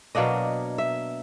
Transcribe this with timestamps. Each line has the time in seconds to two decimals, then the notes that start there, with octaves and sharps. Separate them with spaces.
0.15 B2 F#3 A#3 D4 D#5
0.78 E5